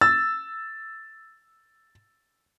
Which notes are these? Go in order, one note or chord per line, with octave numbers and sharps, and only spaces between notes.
E6 A6